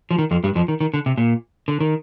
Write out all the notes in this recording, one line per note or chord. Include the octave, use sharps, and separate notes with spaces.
F3
D#3
F2 F3
G2 G3
F2 F3
D#3
D#3
D3
C3
A#2
D3
D#3